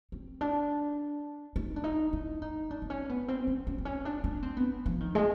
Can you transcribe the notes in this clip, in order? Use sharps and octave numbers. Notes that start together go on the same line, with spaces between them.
C4
D4
D#4
D4
D#4
E4
D#4
D4
C4
C#4
B3
C4
C#4
C#4
C4
C#4
D4
D4
C4
B3
F3
D#3
G#3